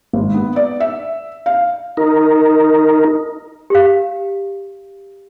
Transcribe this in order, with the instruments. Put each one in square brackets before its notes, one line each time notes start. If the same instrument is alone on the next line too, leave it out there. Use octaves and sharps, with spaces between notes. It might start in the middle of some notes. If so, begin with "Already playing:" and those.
[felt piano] G#1
B3
D5
E5
F5
[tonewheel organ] D#4 A#4
[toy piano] G4 F5